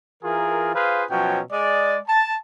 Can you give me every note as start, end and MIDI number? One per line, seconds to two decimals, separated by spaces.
0.23 0.72 52
0.23 0.72 65
0.23 0.72 68
0.23 0.72 70
0.74 1.05 65
0.74 1.05 68
0.74 1.05 71
0.74 1.05 72
0.74 1.05 77
1.11 1.40 47
1.11 1.40 53
1.11 1.40 54
1.11 1.40 61
1.11 1.40 79
1.52 1.98 56
1.52 1.98 68
1.52 1.98 74
2.08 2.35 81